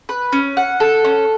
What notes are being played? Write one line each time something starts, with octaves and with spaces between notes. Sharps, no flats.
B4
C#4
F#5
A4
C#4